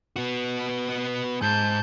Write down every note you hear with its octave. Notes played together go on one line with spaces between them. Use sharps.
B3 F#4
G#2 A5 G6